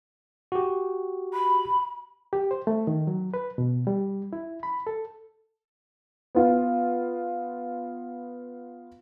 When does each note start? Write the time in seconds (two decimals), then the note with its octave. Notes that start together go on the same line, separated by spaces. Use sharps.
0.52 F#4 G4
1.33 B5
2.33 G4
2.51 C5
2.67 A3
2.87 D#3
3.07 F#3
3.34 B4
3.58 B2
3.87 G3
4.33 E4
4.63 B5
4.87 A4
6.35 B3 F4